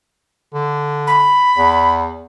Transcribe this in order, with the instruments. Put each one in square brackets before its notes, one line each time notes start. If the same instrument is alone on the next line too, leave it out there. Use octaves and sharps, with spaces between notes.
[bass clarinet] D3
[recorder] B5
[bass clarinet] E2